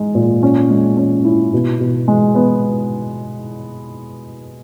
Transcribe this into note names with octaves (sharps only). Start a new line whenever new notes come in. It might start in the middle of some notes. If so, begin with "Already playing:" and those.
Already playing: G#3 D#4
A#2
C#4
G#3
C#4
E4
B2
B2
G#3
B3